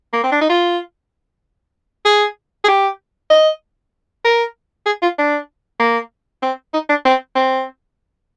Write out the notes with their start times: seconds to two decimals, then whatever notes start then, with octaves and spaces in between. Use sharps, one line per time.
0.13 A#3
0.23 C4
0.32 D4
0.41 D#4
0.49 F4
2.05 G#4
2.64 G#4
2.68 G4
3.30 D#5
4.25 A#4
4.86 G#4
5.02 F4
5.18 D4
5.80 A#3
6.42 C4
6.73 D#4
6.89 D4
7.05 C4
7.35 C4